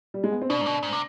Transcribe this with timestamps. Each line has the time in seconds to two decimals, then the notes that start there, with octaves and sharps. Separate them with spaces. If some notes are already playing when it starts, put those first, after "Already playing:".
0.14 G3
0.24 G#3
0.32 B3
0.42 C4
0.49 B2 D4
0.61 G#2
0.66 B2
0.83 G#2
0.93 C3